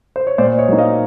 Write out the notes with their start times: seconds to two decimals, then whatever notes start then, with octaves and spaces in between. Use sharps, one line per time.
0.16 C5
0.27 C#5
0.38 A#2 C5 D5
0.58 C#5 D#5
0.69 F#3 A#3 D#4
0.78 D#5 F5